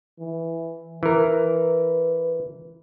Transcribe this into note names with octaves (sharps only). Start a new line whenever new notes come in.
E3
E3 A#4 B4